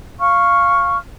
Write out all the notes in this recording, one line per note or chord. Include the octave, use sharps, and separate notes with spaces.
F5 C#6 F6